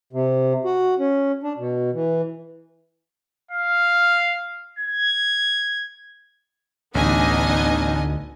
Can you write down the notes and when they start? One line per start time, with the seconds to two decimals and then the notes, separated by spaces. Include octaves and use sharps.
0.13 C3
0.65 F#4
0.99 C#4
1.43 D4
1.58 B2
1.94 E3
3.51 F5
4.79 G#6
6.95 A1 D2 B3 D4 D#4 D#5 G#5